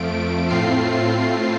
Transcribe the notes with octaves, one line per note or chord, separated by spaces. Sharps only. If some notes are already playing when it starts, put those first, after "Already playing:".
Already playing: F2 F3 A3 D7
A2 A3 C4 F4 C7
C7